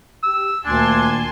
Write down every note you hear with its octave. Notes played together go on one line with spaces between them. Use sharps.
G4 E6
D2 A#2 D#3 A#3 D4 G#5 A5 C6